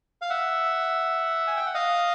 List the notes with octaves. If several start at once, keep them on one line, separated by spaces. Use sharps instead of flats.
F5
E5 F#5
G#5
G5
F#5
D#5 F5